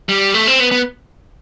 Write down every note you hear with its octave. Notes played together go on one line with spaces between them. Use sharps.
G3
A3
C4
B3
B3